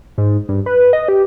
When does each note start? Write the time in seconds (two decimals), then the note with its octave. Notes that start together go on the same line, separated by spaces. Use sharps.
0.18 G#2
0.49 G2
0.66 B4
0.93 D#5
1.08 G4